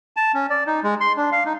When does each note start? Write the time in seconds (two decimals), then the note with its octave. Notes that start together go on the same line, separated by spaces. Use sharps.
0.17 A5
0.34 C#4
0.50 D5
0.67 D#4
0.84 G#3
1.01 C6
1.17 D4
1.32 F5
1.45 D#4